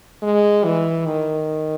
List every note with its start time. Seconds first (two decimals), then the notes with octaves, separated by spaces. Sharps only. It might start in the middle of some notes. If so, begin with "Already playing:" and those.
0.23 G#3
0.64 E3
1.06 D#3